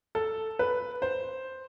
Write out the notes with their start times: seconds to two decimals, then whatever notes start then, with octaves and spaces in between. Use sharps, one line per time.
0.15 A4
0.59 B4
1.02 C5